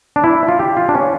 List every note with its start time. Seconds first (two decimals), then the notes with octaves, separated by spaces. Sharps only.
0.16 D4
0.24 E4
0.48 F4
0.59 G4
0.77 F4
0.89 D4
0.95 C#4